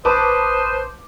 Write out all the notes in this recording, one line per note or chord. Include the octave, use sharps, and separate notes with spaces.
A1 B4 C5 A5 D6 D#6